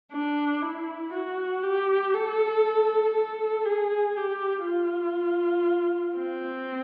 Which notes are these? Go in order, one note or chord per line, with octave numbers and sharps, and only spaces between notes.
D4
E4
F#4
G4
A4
A4
G#4
G4
F4
C4